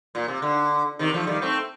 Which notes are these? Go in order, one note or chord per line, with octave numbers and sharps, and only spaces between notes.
A#2
C3
D3
C3 D#3
F3 A3
D#3 G3
A3 C4